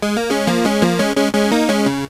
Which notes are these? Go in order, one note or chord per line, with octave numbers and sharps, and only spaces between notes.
G#3
A#3
G#3 C#4
F3 A#3
G#3 C#4
F3 A#3
G#3 C#4
G#3 C#4
G#3 C#4
A#3 D#4
G#3 C#4
C#3